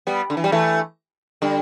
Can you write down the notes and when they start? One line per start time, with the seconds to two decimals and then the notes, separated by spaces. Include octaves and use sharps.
0.07 G3 B3
0.30 D3
0.37 E3
0.44 G3
0.52 E3 A3
1.42 D3 G3